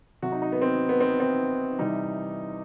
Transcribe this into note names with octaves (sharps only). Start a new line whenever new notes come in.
C3 F#3 F#4
D#4
D#4
B3
C4
B3
C4
C4
C3 E3 G3 D#4